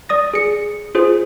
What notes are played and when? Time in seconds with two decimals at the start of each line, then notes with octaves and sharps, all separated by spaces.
0.09 D5 D#6 A#6
0.34 G#4 C#7
0.95 F4 G#4 C5